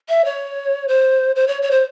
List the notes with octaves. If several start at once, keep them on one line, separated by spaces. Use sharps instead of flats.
E5
C#5
C5
C5
C#5
C#5
C5